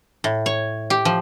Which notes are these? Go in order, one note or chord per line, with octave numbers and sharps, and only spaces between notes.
A2
C#5
G4
F3